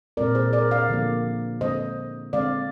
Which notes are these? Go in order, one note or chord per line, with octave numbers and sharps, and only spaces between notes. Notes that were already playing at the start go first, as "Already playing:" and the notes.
A#2 G#3 C4 A#4 D5
G#4 C5
A#4 D5
D5 F5
D3 F3 A#3
D3 G#3 C4 C5 D#5
D3 G#3 C4 D5 F5